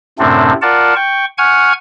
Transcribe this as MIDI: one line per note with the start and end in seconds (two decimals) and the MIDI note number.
0.19 0.53 42
0.19 0.53 45
0.19 0.53 48
0.19 0.53 57
0.19 0.53 60
0.19 0.53 62
0.62 0.94 65
0.62 0.94 70
0.62 0.94 74
0.62 0.94 78
0.62 0.94 81
0.96 1.25 79
0.96 1.25 85
1.38 1.73 78
1.38 1.73 80
1.38 1.73 85
1.38 1.73 89
1.38 1.73 92